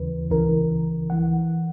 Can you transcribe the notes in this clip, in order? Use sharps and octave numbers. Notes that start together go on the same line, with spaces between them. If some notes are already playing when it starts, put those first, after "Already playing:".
Already playing: D#2 C#3 E3 B4
C#2 C#3 E3 A#4
E3 F#5